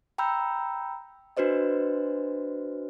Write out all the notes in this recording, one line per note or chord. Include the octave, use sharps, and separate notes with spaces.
G5 A#5 B5 E6 G6
D4 F#4 B4 C5 D#5